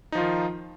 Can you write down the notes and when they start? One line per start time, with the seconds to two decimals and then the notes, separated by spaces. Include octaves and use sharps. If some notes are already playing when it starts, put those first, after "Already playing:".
0.12 D#4
0.15 F3
0.18 F4
0.20 D#3